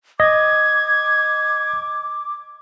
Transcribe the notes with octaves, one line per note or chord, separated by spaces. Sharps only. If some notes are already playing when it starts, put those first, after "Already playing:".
D#5 D6 G#6